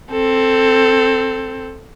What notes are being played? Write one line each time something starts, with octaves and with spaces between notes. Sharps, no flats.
C4 A4